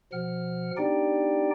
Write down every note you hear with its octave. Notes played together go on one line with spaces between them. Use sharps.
B2 F3 F#5 F6
B3 D4 D#4 G4 D5 G5